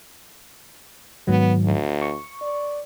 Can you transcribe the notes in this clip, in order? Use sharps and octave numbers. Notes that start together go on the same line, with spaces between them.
G#2 D#3 F#3 B3
D2
C#6
D5